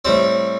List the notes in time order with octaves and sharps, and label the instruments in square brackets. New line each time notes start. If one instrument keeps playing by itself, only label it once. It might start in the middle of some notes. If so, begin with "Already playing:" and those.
[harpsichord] A2 G3 C4 C5